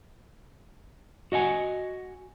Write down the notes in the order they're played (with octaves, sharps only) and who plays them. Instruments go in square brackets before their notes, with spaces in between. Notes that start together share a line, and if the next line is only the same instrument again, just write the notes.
[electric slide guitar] F#4 D#5 F#5 G#5